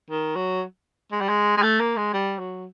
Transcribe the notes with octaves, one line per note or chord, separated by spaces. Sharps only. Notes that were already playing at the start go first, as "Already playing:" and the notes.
D#3
F#3
G#3
G3
G#3
G#3
A3
A#3
G#3
G3
F#3